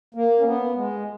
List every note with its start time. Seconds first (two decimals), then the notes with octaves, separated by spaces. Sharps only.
0.14 A#3
0.39 C#4
0.45 B3
0.76 G#3